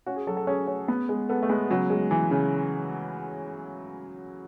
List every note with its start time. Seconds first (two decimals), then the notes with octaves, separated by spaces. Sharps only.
0.06 C#4 F#4
0.16 G#4
0.27 F#3 A4
0.37 A4
0.47 C#4 G#4
0.68 C#4
0.88 B3
1.09 G#3
1.29 B3 A4
1.43 A3
1.49 G#3 B3
1.70 C#3 F#3
1.90 G#3
2.11 E3
2.31 C#3